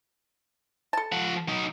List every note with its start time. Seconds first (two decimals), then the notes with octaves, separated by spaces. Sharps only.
0.93 A4 A5
1.12 F3 F#5
1.48 F#3 D#4